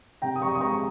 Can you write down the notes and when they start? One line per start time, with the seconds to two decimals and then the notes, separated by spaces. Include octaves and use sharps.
0.22 C3 G5 A#5
0.36 D#6
0.42 C3 A#5 C#6
0.55 D#6
0.61 G#3 A#5 C#6